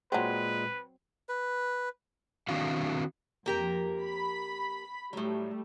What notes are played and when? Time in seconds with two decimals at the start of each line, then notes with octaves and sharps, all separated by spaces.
0.12 A#2 F#3 G#3 C4 B4
1.29 B4
2.49 D#3 C4 D4 E4 F#4 F5
3.46 F2 F3 A#3 G4 A#4
4.03 B5
5.13 A2 F#3 G3 A3